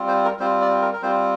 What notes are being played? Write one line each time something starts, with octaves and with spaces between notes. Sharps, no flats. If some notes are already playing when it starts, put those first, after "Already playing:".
Already playing: G3 C4 F4
C5
A#4
G3 C4 F4 C5
D5
A#4
A#4
G3 C4 F4 C5